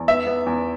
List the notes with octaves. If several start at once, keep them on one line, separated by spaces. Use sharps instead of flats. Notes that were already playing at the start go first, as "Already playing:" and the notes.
Already playing: E2
B3 E5
B3
E2